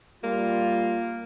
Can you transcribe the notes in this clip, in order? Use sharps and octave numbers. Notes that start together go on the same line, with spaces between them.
G3 A#3 F4